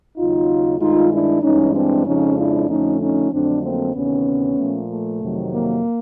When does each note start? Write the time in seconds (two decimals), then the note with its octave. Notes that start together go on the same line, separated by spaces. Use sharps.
0.17 D#2 C#3 F#3 D#4 F4
0.80 G2 D#3 G#3 D#4 F4
1.12 D4 E4
1.42 G2 E3 G#3 C#4 D#4
1.74 C4 D4
2.05 F2 C#3 F3 G#3 C#4 D#4
2.37 D4 E4
2.68 F2 D3 F3 A3 C#4 D#4
3.00 C#4 D#4
3.31 F2 D3 F#3 A3 C4 D4
3.62 A#3 C4
3.94 D2 C3 D#3 B3 C#4
4.57 A#2 F3 A3
4.89 A3
5.20 F2 C3 D#3 F#3
5.51 A#3